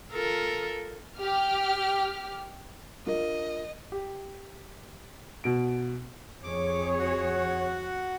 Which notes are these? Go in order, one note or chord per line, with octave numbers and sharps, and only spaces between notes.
F4 A4 A#4
G4 F6
D4 F4 A#4 D#5
G4
B2 D7
F2 G#4 C#5 D6
F#4 F#5